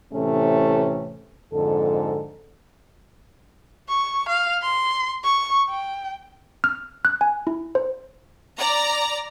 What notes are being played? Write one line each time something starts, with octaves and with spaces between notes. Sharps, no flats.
A2 C3 E3 A3 C#4
F2 G#2 D3 A4
C#6
F5
C6
C#6
G5
F6
F#6
G#5
E4
C5
D5 A#5